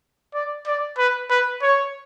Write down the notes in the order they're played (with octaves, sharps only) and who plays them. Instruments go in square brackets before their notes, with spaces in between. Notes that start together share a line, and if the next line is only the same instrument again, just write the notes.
[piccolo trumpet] D5
D5
B4
B4
C#5